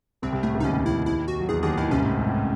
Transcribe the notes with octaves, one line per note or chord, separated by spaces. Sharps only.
C2 C3 C4
C2 C3
A2 A3
C#2 C#3
D#4
D#2 D#3 C#4
E4
E4
F#4
F#3
E2 E3 G#4
D#2 D#3 G#4
D#2 D#3 E4
C2 C3 C#4
G#2
A2
G#2
A2